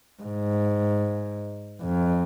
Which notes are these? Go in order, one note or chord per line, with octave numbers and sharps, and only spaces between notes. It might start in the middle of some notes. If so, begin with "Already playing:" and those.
G#2
F2